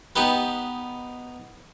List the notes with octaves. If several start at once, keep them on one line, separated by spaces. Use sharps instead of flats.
B3 D#4 G4 B4